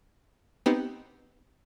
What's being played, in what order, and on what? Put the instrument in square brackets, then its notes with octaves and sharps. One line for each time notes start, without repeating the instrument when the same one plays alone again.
[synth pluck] B3 C4 D#4 G4